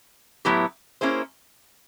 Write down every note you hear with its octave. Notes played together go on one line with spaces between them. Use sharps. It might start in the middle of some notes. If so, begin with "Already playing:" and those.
A2 F#3 B3 E4 G4
A#3 C#4 E4 G#4 C5